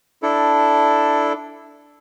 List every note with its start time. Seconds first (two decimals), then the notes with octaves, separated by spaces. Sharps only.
0.23 D4 E4 A4